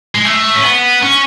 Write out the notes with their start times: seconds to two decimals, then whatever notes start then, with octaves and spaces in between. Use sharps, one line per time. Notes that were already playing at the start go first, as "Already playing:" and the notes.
0.15 G#3
0.25 A3
0.55 C#4
0.63 B3
1.02 C#4